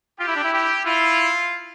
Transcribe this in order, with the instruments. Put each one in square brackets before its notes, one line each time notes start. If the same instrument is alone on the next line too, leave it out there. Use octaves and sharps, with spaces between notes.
[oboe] F4 [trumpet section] G4
[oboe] E4
D4
E4
[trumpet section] G4
[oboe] E4 [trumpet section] F4